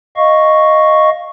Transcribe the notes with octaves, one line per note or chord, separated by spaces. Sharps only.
D#5 F5 C#6